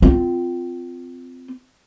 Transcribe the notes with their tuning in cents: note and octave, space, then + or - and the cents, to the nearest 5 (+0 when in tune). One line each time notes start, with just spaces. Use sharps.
C4 -20 F4 +0